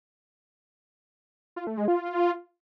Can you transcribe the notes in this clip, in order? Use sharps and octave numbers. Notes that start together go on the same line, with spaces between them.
F4
A3
G#3
F4